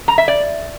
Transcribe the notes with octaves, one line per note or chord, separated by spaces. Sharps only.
A#5
E5
D5